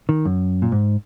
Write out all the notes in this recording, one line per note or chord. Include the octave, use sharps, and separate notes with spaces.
D#3
F#2
A#2
G#2